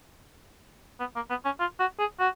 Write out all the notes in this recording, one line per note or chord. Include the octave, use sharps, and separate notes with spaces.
B3
A#3
B3
C#4
F4
F#4
G#4
F#4